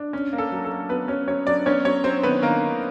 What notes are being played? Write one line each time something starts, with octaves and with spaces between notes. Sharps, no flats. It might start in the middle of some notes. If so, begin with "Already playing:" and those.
Already playing: D4
C#4
A#3
A4
F#3
A4
A#3
F#3 B3 B4
F#3 C#4 C#5
F#3 C#4 C#5
F#3 D4 D5
B3 C#4 C#5
F#3 C#4 C#5
F#3 C4 C5
D#3 B3 B4
D#3 A#3 A#4
D#3